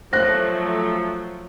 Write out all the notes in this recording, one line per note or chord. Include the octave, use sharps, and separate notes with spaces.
F3 F#3 A3 C5 F#6 A#6